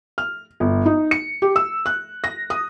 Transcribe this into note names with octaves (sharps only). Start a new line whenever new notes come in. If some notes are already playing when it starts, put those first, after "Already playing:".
F6
G1
D#4
C#7
G4
E6
F#6
A#6
D#6